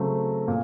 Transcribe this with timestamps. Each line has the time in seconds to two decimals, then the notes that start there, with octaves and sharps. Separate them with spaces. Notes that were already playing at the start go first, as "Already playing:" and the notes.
Already playing: C#3 F#3 A3 C4
0.48 A#2